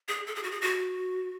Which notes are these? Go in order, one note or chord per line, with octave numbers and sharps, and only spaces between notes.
G#4
A4
G#4
F#4
G#4
F#4